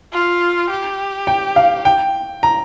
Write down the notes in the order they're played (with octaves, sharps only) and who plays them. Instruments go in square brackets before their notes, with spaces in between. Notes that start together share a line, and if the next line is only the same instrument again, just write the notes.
[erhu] F4
G4
[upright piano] G5
F5
G5
A#5